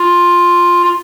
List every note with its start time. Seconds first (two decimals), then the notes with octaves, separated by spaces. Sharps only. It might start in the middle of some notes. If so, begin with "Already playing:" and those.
Already playing: F4
0.84 F4